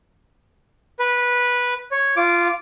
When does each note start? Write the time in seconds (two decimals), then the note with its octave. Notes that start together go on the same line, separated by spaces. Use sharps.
0.99 B4
1.91 C#5
2.17 F4 D6